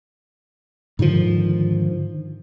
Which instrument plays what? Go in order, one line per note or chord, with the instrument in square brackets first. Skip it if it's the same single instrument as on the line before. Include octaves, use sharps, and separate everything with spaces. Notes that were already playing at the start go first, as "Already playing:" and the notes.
[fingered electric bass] G#2 D3 D#3 F3